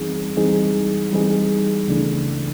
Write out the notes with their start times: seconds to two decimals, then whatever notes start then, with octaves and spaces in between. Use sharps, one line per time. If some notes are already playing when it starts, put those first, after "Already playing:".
Already playing: E3 G3 C4 D#4 G#4
0.37 E3 G3 C4 D#4 G#4
1.12 E3 G3 C4 D#4 G#4
1.87 C#2 C#3 E3 A3 D4